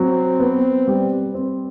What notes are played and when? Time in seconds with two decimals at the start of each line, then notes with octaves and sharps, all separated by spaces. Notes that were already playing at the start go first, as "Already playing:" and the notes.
Already playing: F#3 C4
0.40 B3
0.87 G3
1.34 C4